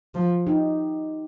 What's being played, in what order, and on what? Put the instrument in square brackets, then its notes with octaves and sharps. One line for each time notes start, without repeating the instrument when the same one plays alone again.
[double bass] F3
[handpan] D#4 G4